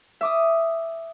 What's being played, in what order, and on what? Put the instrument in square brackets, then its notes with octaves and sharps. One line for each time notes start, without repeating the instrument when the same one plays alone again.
[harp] E5 D6 D#6